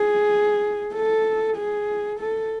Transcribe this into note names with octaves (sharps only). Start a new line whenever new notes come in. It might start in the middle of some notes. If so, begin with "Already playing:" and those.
Already playing: G#4
A4
G#4
A4